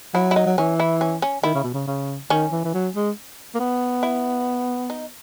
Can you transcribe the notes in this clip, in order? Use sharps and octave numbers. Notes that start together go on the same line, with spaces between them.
F#3 E4
E4
D#4
F#3
E3 C#4
E4
C#4
C#4
D#3 E4
C#3
B2
C#3
C#3
D#3 C#4
E3
E3
F#3
G#3
A#3
B3
E4
D#4